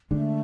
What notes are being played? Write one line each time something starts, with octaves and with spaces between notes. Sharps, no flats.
D3 G#3 A3 D4